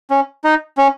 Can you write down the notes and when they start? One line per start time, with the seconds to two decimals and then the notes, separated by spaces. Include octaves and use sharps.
0.10 C#4
0.44 D#4
0.78 C#4